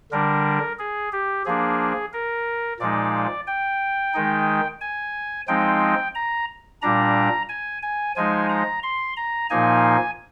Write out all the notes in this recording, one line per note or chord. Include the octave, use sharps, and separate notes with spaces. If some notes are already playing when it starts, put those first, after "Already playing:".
D3 G3 D4 A#4
G#4
G4
F3 A#3 D4 G#4
A#4
A#2 F3 G#3 D#4 D5
G5
D#3 G#3 D#4
G#5
F3 G#3 C4 D#4 G5
A#5
A#2 G3 D4 A#5
G#5
G#5
F3 G#3 D#4 G#5
A#5
C6
A#5
A#2 F3 A#3 D#4 G#5